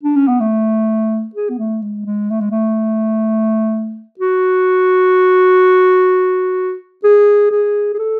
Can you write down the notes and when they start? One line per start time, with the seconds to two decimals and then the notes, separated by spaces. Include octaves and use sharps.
0.03 D4
0.16 C#4
0.28 B3
0.40 A3
1.36 G#4
1.50 B3
1.58 A3
1.82 G#3
2.06 G#3
2.31 A3
2.41 G#3
2.51 A3
4.20 F#4
7.04 G#4
7.52 G#4
7.94 G#4
7.99 A4